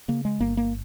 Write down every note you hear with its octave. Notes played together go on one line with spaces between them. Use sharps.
C#3 A#3
G#3
G1 A#3
A#3